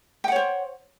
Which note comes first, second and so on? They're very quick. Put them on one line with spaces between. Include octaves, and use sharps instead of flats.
G5 F#5 C#5 C5